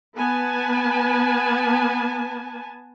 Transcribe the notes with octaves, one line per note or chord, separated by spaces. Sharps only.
B3 B4 G#5 A5